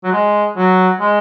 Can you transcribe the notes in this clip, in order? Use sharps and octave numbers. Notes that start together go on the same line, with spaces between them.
F#3
G#3
F#3
G#3